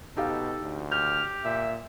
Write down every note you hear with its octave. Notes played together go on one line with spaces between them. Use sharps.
B2 D#4 G4 A4 F5
D2
G4 F6 G6
A#2 E5